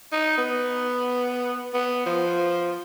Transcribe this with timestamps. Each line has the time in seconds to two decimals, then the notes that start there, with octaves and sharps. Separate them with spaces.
0.12 D#4
0.38 B3
1.73 B3
2.06 F3